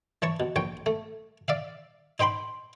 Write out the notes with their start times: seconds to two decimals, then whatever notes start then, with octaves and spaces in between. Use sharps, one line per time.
0.22 E3 C#5 A5 C#6
0.40 B2
0.56 A#1 C#5 G5
0.86 A3
1.48 D5 E5 F5
2.19 D#4 C5 G5 B5 C6